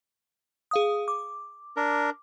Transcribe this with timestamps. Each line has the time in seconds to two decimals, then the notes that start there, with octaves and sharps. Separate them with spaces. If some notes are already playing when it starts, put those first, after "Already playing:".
0.71 G#4 F5 D#6
1.08 D6
1.77 D4 A#4